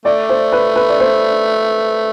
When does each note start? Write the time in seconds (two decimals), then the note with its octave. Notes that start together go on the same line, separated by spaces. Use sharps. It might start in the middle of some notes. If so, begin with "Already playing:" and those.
0.05 A3 D5
0.29 C5
0.52 B4
0.76 B4
0.89 D5
1.00 C5